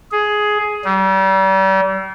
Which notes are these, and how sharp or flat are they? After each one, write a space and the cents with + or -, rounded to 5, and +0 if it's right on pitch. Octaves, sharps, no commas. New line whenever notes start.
G#4 +10
G3 -35